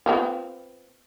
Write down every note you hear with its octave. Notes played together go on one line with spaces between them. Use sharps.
B3 C4 F4